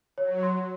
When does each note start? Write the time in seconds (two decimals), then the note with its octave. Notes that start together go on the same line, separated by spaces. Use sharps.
0.18 F#3 C#5
0.43 C6